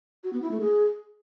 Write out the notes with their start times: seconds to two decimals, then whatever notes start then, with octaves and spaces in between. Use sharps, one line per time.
0.24 F#4
0.33 B3
0.42 E4
0.51 A3
0.61 G#4